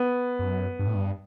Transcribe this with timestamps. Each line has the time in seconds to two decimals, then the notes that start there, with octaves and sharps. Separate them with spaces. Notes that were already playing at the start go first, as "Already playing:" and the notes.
Already playing: B3
0.39 F#2
0.79 G2
0.87 A2
0.95 G2